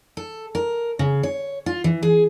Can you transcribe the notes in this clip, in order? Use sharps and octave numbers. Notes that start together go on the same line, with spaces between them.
A4
A#4
C#3
C#5
F4
E3
G#4